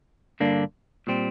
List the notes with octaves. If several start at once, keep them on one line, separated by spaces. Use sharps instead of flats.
G2 D3 A#3 D4
A#2 G3 C4